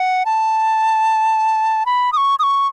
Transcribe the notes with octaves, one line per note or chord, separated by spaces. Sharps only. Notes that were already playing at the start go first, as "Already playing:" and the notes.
Already playing: F#5
A5
B5
D#6
C#6
D#6
C#6